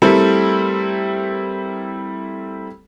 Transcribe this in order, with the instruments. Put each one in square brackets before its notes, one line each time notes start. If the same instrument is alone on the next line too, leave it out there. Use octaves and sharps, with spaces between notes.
[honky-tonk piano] G3 A3 C4 E4 A4 A#4